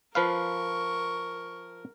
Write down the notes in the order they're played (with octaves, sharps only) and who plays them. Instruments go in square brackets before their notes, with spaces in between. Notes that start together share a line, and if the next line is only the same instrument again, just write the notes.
[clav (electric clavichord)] F3 B4 F5 [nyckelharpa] A#4 [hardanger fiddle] C#6